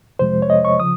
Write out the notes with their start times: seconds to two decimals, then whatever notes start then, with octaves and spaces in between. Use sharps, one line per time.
0.19 F2 C3 F3 G#3 C5
0.42 C#5
0.50 D#5
0.65 C#6
0.80 C#3 F3 D#6